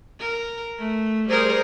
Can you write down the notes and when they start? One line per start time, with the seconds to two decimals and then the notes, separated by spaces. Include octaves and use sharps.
0.20 A#4
0.79 A3
1.29 G3 G#4 A#4 C5